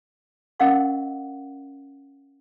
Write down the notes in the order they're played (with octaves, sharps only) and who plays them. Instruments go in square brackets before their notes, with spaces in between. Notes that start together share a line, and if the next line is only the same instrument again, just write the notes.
[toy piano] C#4 A#4 D#5 F5 F#5 C#6